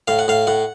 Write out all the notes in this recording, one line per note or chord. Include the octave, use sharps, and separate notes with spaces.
A2 F5
F#5
A2 F5
A2 F#5